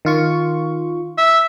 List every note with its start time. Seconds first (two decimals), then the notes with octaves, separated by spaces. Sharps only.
0.05 D#3 F4 C#6
1.18 E5